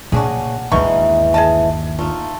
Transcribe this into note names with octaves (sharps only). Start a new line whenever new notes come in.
A#2 C#3 C#4 D4 F#4 G#4
G1 D#2 B2 E3 G#3 D#4 C#6
G#4 D#5 A5
A3 D#4 F4